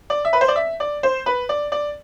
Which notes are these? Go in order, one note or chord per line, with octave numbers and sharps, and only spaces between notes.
D5
E5
B4
C5
D5
E5
D5
C5
B4
D5
D5